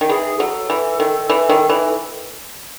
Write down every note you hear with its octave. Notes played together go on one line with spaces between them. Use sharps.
D#3
E3 G#4
F#3 A4
E3
D#3
E3
D#3
E3